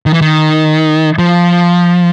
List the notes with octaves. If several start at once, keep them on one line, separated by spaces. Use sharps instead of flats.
D#3
E3
D#3
F3